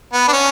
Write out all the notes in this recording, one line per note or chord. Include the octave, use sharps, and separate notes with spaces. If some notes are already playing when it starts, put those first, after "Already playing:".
B3
D4
C#4